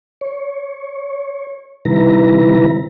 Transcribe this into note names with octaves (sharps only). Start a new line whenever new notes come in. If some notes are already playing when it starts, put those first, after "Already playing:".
C#5
C3 D#3 G3 E4 B4 A#5